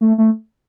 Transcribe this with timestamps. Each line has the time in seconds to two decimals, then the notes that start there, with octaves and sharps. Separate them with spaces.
0.01 A3
0.18 A3